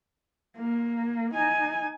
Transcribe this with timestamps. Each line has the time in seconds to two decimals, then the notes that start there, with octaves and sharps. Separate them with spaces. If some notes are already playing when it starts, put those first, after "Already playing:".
0.57 A#3
1.34 D#4 G#5